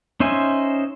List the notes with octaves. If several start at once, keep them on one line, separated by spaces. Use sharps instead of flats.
C#4 D#4 C5 E5 G#5